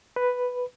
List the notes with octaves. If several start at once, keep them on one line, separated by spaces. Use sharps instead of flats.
B4